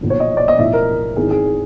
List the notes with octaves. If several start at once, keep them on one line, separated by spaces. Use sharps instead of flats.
B1 A#2 F3
C#5
D#5
D5
D#5
B1 A2 F3 E5
A#4
G#1 G#2 E3 G#4
G#4